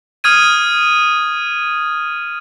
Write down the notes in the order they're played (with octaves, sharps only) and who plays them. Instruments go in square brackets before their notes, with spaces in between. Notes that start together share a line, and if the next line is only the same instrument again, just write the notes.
[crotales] D#6 F6 G#6 D#7